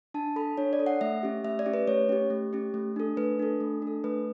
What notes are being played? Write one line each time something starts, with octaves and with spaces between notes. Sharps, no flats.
D4 A5
A4 B5
D4 C#5
D5
A4
F#5
A3 E5
C#4 G4
A3 E5
D5
C#4 G4
B4
A3 C#5
C#4 G4
A3
C#4 G4
A3
D4 A4
A3 B4
D4 A4
A3
D4 A4
A3 B4